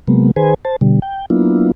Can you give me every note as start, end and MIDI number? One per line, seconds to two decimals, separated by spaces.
0.08 0.31 48
0.08 0.31 54
0.08 0.31 56
0.08 0.31 58
0.08 0.31 59
0.36 0.54 51
0.36 0.54 68
0.36 0.54 71
0.36 0.54 72
0.36 0.54 80
0.65 0.76 72
0.65 0.76 81
0.81 1.00 47
0.81 1.00 50
0.81 1.00 55
1.02 1.26 79
1.30 1.71 54
1.30 1.71 58
1.30 1.71 59
1.30 1.71 62
1.30 1.71 64
1.30 1.71 65